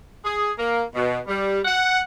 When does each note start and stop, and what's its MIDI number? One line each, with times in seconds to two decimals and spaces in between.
0.24 0.52 68
0.58 0.81 58
0.94 1.18 47
1.26 1.60 55
1.65 2.00 78